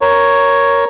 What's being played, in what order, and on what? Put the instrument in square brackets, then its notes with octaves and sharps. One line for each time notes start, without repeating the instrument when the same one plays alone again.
[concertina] A#4 C#5